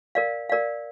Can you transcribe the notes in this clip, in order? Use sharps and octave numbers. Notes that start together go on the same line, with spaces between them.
A#4 D5 F5
A#4 D5 F5